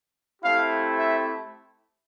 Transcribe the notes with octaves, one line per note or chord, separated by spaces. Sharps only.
A3 C4 E4 G4 F5
E5